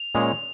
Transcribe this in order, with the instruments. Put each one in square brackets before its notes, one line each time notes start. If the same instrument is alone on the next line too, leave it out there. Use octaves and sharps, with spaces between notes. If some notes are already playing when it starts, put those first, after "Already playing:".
Already playing: [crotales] F7
[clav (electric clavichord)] A#2 G#3 C#4 G#4 C#5